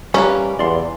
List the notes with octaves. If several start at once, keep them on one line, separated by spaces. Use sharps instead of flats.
E3 G3 A#3 C#4 G4 B4
E2 D5 C6